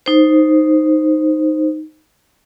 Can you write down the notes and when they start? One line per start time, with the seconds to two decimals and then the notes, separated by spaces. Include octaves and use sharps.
0.06 D#4 C5